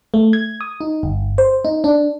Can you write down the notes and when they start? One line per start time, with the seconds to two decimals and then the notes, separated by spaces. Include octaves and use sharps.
0.14 A3
0.33 G#6
0.61 D#6
0.81 D#4
1.03 G1
1.38 C5
1.65 D#4
1.84 D4